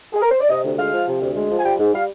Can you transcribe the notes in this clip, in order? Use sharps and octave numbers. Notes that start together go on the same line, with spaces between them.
G#4
A#4
C5
D5
C3 D#5
D2
G#3 F5
F3
C3
D2
G#3
F3
G#5
G3 G5
G#2
G3 F5